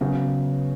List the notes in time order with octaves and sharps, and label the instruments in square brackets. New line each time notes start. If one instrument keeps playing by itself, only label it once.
[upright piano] C#3 F#3 B3 F#4